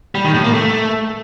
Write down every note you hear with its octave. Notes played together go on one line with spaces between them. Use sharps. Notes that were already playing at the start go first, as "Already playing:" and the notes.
G3
D#3
A2
A#3
A3